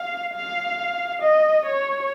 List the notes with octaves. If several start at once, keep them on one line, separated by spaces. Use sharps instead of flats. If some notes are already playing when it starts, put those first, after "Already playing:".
Already playing: F5
F5
D#5
C#5